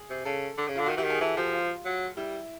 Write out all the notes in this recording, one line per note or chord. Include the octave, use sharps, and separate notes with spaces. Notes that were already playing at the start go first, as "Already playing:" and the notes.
Already playing: G#4
C3
C#3 A4
D3
C#3
D3 F4
D#3 F#4
E3 G4
D#3
G#4
E3 A4
F3 G4
F4
F#3
G3 E4